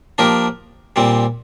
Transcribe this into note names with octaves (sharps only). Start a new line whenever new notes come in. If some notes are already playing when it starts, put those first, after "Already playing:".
F3 A#3 D4 G4 A#4
A#2 G3 C4